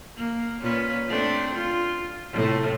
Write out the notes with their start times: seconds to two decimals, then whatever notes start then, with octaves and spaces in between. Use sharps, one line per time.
0.16 A#3
0.61 A#2 C#4 B4
1.08 A3 C4 D4
1.54 F4
2.33 A2 C3 A3